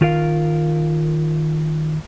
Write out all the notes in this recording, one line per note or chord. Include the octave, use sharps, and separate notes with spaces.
D#3 F4 A#4 F5